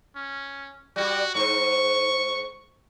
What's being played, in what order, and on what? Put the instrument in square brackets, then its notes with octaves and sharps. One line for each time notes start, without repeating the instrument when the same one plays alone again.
[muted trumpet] C#4
[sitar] G3 G4 [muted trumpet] F#4
[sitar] G#2 C5 [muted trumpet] C#6